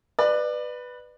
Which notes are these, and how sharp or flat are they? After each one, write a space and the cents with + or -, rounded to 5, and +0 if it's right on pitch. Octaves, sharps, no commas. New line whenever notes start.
B4 +0 D5 +30